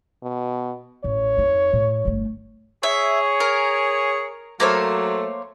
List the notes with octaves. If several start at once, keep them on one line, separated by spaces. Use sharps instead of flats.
B2
A1 C#5
F2 D#4
A2
G1 A3
G#4 C#5 E5
A#4
F#3 A3 A#3 C5 C#5